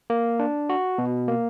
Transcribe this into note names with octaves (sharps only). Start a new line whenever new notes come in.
A#3
D4
F#4
B2
A#3